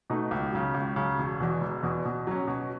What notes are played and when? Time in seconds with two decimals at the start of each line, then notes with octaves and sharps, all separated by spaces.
0.10 B2 A3 D#4
0.31 C#2
0.53 C#3 F#3
0.74 C#2
0.96 C#3 F#3
1.19 E1
1.40 E2 B2
1.61 E1
1.83 E2 B2
2.05 B2
2.27 F#3 C#4
2.48 B2